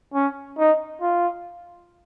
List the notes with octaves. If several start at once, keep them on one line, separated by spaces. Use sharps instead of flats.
C#4
D#4
F4